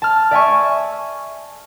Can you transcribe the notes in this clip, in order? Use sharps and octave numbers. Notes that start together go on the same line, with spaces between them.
A5 F6
D5 E5 G#5 C#6